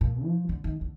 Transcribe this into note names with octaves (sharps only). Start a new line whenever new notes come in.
A#2
F3
D3
D#3
D3